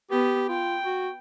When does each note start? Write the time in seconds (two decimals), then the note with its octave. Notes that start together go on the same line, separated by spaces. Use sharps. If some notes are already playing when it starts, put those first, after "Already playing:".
0.11 B3 G4
0.49 F4 G5
0.84 F#4